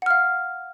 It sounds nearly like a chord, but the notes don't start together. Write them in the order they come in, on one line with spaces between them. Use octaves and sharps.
F#5 F6 F5